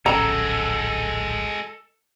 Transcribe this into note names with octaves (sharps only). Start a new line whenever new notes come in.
D1 A#1 G#3 C#4 F#4 A4 A#5